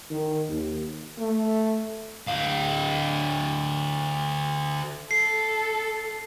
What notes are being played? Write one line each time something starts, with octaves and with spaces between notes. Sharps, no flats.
D#3
D#2
A3
D2 F5
A4 C7